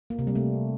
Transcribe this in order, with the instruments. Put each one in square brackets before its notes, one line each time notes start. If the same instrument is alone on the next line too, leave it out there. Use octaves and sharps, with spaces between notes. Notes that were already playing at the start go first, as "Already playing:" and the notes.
[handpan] A#3
C3
G3
A3